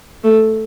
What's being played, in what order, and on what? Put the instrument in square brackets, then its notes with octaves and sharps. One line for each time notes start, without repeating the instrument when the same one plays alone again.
[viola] A3